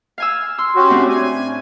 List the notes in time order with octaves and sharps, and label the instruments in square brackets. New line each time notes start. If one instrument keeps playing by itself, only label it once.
[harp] F5 G#5 E6
C6 E6
[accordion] C#4 F#4 G4
[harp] A2 C4 D4
[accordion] G#5